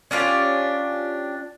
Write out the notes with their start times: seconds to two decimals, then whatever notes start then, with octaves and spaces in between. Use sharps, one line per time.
0.11 C#4 D4 F4 G4